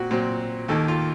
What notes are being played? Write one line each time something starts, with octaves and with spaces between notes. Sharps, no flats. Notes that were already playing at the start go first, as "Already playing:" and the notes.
Already playing: A#2 C4 F#4
A#2 F#3 C4
D#2 D#3 A#3 A4
F4